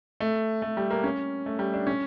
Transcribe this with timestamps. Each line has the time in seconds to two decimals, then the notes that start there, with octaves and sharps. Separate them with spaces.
0.20 A3
0.62 A3
0.77 G3
0.91 A#3
1.04 C#4
1.46 A3
1.59 G3
1.74 D4
1.87 C#4